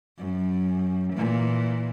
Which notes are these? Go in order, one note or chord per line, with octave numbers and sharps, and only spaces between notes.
F#2
A#2 E3